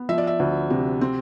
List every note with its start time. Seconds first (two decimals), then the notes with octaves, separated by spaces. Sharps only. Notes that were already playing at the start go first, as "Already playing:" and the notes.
Already playing: B3
0.09 F3 E5
0.18 D5
0.27 E5
0.40 D2
0.70 C3
1.01 C4